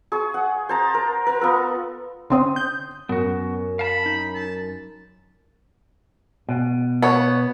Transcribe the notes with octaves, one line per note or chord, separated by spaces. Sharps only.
G#4 C#6
F#5
C5 A5 A#5
A#4
A#4 A#5
B3 F4 A4
D3 C4 C#4 C6 D#6
G6
F#2 B3 F#4
F5 A5 B5
D#4
A5
B2
B3 C#5